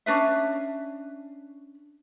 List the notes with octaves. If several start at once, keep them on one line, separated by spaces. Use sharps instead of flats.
C#4 D4 B4 E5